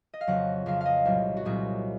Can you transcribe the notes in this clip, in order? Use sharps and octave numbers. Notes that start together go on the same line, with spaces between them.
D#5
F5
F2 C#3 F#3 F#5
F2 C#3 F#3 F5
D#5 F5
C2 A#2 F#3
F#4
C2 A#2 F#3 G#4